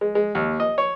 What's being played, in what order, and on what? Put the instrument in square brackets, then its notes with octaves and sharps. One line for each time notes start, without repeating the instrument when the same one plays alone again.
[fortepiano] G#3
G#3
D#2
D#5
C#5